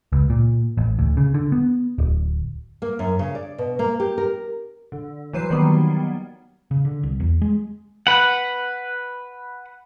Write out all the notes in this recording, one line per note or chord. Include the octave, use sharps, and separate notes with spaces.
C#2
A#2
A1
D2
C#3
D3
B3
D1
A#3
F#2
C#3
D5
B2
A#3
G4
A#4
D3
E3 F#3 B4 C5 C7
D#3 F#3 G3 A#3 B3
C#3
D3
C2
E2
G#3
B4 F#5